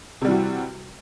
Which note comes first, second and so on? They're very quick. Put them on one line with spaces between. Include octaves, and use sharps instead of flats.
C3 G3 E3 F#4